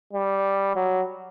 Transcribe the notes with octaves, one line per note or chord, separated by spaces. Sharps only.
G3
F#3